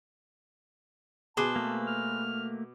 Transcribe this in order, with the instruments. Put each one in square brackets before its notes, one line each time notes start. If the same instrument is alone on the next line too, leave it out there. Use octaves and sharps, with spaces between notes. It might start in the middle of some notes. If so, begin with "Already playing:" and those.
[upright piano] B2 D6 [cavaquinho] G#4 B4 C5 [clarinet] A5
[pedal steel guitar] A3 A#3
[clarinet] F6